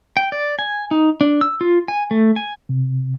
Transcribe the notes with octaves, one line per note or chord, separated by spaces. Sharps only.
G5
D5
G#5
D#4
D4
E6
F4
G#5
A3
G#5
C3